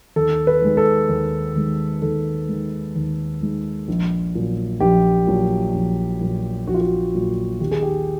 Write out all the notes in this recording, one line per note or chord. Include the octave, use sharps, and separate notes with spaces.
D#2 A4
B4
D#3 G#3
A4
D#2
D#3 G#3
D#2 A4
D#3 G#3
D#2
D#3 G#3
A#1
A#2 F#3
A#1 G4
A#2 F#3
A#1
A#2 F#3
A#1 F#4
F4
F#4
A#2 F#3
D#2 G4
G#4
G4